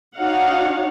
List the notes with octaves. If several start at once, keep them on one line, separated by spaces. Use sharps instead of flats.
D4 D#4 F#4 C#5 F5 F#5